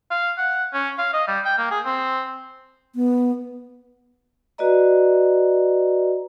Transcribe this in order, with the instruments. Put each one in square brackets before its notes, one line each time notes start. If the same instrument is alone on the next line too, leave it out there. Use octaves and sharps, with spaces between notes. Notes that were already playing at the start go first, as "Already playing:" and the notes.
[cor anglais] F5
F#5
C#4
F5
D#5
G3
G5
A#3
G#4
C4
[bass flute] B3
[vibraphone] F#4 B4 D5 D#5 A#5